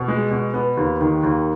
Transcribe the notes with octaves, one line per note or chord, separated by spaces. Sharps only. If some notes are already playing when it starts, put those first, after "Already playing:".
Already playing: B2
G#3
B2
B3
D#2
D#3
D#2